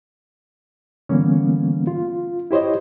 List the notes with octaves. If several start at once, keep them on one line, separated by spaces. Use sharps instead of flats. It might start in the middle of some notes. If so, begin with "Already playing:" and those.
D3 E3 G3 A#3 B3 C#4
F4
E4 G4 C5 C#5 D#5